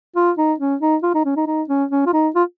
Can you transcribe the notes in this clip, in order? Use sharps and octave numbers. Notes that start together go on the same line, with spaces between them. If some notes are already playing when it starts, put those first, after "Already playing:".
F4
D#4
C#4
D#4
F4
D#4
C#4
D#4
D#4
C#4
C#4
F4
D#4
F4